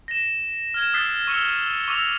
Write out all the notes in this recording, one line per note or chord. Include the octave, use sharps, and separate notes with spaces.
A#6 E7
F6 G#6 E7
D#6 E6 F#6 A6 B6 C7
C#6 E6 C#7 F7 G7
C#6 D6 E6 A#6 F7